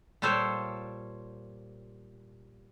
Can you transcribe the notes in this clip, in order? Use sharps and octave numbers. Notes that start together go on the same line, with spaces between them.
A#2 G3 F4 A4 C5 C#5